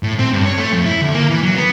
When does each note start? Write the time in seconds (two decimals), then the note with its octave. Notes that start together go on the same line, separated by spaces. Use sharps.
0.03 A2
0.19 C4
0.33 G2
0.45 C#5
0.58 A3
0.73 F2
0.86 E4
1.01 D2
1.14 A#3
1.30 E3
1.43 F#3
1.55 B3